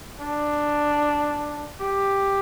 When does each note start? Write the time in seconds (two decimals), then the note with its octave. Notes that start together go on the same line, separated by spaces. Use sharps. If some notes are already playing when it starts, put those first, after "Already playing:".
0.20 D4
1.81 G4